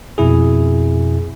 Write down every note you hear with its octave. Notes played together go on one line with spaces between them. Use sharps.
F2 B2 E4 G#4